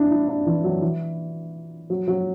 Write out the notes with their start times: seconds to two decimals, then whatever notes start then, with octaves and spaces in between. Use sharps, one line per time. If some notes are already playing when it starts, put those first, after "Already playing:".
Already playing: D4 E4
0.10 E4
0.28 D4
0.46 E3
0.64 F#3
0.82 E3
1.90 F#3
2.08 F#3